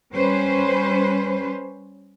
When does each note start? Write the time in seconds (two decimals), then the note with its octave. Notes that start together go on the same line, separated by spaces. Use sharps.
0.13 G3 C#4 B4 C5